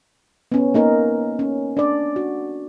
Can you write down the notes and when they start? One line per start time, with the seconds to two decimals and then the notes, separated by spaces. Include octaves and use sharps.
0.52 B3 C#4
0.74 A#3 D#4 A#4
1.39 C#4
1.77 D4 D5
2.16 F#4